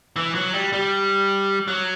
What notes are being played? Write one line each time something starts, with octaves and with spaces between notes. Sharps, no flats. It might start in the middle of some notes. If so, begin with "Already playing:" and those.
E3
F#3
G3
G3
F#3